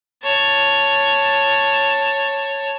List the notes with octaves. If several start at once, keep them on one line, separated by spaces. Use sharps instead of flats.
C#5 A5